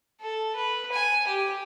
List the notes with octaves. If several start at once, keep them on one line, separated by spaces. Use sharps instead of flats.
A4
B4
G#5
G4